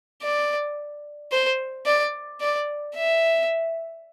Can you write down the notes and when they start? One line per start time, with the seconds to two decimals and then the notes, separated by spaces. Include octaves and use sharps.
0.22 D5
1.32 C5
1.86 D5
2.41 D5
2.95 E5